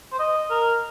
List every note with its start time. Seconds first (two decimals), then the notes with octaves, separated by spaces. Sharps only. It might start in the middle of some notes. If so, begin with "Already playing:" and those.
0.13 C5
0.19 D#5
0.51 A#4